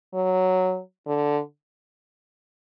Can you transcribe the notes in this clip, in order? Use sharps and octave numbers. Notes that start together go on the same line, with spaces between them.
F#3
D3